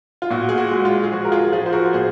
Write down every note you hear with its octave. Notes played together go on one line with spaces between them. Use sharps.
F4
A#2 F#4
G#4
F#4
G#3
F4
G#4
F3 F#4
A#4
F4 G#4
F3 F4 G#4
C5
F#4 A#4
A#2 G#4 C5